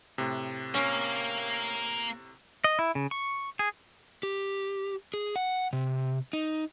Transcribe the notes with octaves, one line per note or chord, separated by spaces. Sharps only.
A2 C3
A#3 C#4
D#5
E4
C#3
C#6
G#4
G4
G#4
F#5
C3
D#4